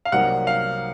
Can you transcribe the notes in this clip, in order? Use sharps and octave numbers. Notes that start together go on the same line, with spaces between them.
F5
C2 C3 F#3 A#3 D#4 F#5
F5